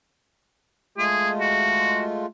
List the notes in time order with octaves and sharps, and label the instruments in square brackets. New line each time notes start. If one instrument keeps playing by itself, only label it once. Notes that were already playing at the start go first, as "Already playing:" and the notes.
[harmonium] G#3 A3 F4 [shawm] G#4
[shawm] F#4